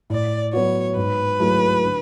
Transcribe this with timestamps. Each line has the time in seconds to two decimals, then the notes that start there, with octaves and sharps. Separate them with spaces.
0.10 A2 D5
0.53 F#3 B3 F#4 C#5
0.96 G#2 B4
1.40 F#3 A3 E4 G#4
1.83 D3